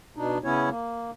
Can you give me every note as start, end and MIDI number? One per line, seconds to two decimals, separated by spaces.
0.17 0.38 47
0.17 0.38 62
0.17 0.38 63
0.44 0.69 49
0.44 0.69 59
0.44 0.69 61
0.44 0.69 64
0.44 0.69 73
0.69 1.11 58